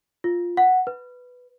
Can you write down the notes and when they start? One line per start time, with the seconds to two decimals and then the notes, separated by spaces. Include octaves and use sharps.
0.24 F4
0.57 F#5
0.87 B4